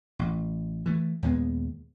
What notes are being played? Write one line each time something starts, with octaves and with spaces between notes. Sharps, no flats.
A1
E3 A3
D#2 A#2 G#3 B3